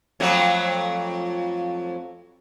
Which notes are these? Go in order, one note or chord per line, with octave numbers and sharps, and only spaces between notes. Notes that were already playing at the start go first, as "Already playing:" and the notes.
F2 F#3 A3